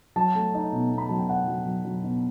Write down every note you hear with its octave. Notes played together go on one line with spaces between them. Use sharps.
F#3 A5
A3
D#4
B2
B2
B5
F#3 A5
G5
D#4 F#5
F#3
F#3
F#3
B2